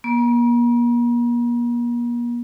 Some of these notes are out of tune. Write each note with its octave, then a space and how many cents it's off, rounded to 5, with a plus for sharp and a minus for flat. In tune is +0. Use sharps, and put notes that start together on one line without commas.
A#3 +45